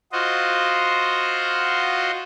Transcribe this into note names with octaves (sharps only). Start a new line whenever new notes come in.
F4 F#4 C5 D#5